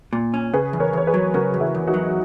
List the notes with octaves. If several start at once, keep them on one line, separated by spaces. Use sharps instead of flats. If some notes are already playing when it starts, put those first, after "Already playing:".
A#2
C#4
C#3 G#4 B4
E2
A#4 C#5
E2 C#5
G#4 B4
F#3
C#3 F#4 A#4
E2
E4 G#4
E2
D#4 F#4
F#3